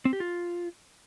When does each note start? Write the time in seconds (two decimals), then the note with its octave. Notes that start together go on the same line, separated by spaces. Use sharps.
0.05 C4
0.13 G4
0.20 F4